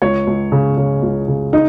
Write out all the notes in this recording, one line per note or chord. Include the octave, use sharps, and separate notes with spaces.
C#2 C#5
C#2
C#3
C#3
C#2
C#3
D#4